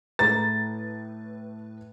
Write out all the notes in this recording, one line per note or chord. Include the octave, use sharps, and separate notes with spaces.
A2 A3 B4 A#5 A6